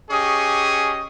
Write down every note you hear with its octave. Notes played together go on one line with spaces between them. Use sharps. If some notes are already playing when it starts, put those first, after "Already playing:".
C#4 G4 G#4 D#5 C#6 D#6